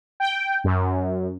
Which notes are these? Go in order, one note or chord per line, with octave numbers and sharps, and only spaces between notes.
G5
F#2